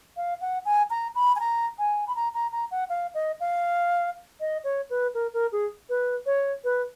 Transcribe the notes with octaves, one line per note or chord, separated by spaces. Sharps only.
F5
F#5
G#5
A#5
B5
G#5
A#5
G#5
B5
A#5
A#5
A#5
F#5
F5
D#5
F5
D#5
C#5
B4
A#4
A#4
G#4
B4
C#5
B4